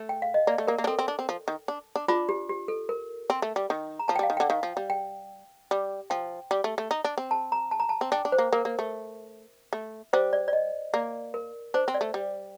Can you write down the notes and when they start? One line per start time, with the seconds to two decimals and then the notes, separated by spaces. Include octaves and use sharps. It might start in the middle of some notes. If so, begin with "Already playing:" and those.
Already playing: A3
0.09 G5
0.22 F5
0.34 D#5
0.47 A#3 D5
0.58 A3
0.67 A#3 A#4
0.78 A#3
0.84 D4
0.87 C4 A4
0.99 C4
1.08 D4
1.19 C4
1.29 F3
1.48 D#3
1.68 D4
1.96 D4
2.08 D4 F4
2.29 G4
2.49 G4
2.68 A4
2.89 A#4
3.30 C4
3.42 A3
3.56 G3
3.70 D#3
3.99 A#5
4.08 F3 A5
4.16 G5
4.19 G3
4.23 F5
4.30 D#3
4.37 D3 G5
4.50 D#3 F5
4.63 F3
4.77 G3
4.90 G5
5.71 G3
6.10 F3 G5
6.51 G3
6.64 A3
6.78 A3
6.91 D#4
7.05 D4
7.18 C4
7.31 A5
7.52 A#5
7.71 A5
7.80 A#5
7.89 A5
8.01 C4
8.12 D4 G5
8.25 D4
8.32 C5
8.38 A#3
8.53 A#3 A#4
8.65 A#3
8.79 A3
9.73 A3
10.13 G3 C5
10.33 D5
10.48 D5
10.53 D#5
10.94 A#3 D5
11.34 A#4
11.74 D4 C5
11.88 C4
11.94 D5
12.01 A3
12.14 G3